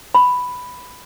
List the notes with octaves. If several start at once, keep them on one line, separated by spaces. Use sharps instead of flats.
B5